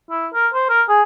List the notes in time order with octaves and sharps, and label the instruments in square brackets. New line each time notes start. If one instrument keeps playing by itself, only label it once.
[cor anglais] E4
A#4
C5
A#4
G#4